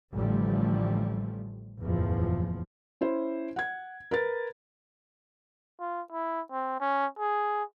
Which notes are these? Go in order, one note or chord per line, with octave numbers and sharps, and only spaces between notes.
A1 D3 F3 G3 A3
F#1 E2 A2 F3
C#4 E4 C5
F#5 G#6
A#4 B4 A6
F4
E4
C4
C#4
G#4